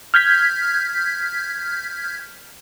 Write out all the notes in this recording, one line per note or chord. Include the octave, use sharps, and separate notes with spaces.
F6 G6 G#6 B6